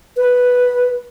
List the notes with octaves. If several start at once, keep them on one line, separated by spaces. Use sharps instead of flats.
B4